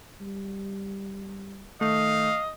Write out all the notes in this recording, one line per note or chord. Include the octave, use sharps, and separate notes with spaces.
G3
D#3 A3 D#5 F5